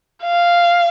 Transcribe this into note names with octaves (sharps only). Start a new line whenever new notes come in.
F5